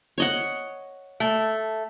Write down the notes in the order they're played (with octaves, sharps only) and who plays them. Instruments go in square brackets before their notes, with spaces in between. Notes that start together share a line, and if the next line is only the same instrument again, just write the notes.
[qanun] C#5 D#5 F#5
[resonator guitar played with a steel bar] A3